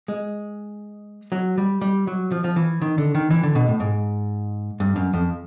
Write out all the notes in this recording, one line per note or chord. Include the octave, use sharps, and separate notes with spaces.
G#3
F#3
G3
G3
F#3
F3
F3
E3
D#3
D3
D#3
E3
D3
B2
A2
G#2
G2
F#2
F2